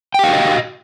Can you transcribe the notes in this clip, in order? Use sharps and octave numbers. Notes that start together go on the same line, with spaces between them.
F#4 G4 D#5 F5 G5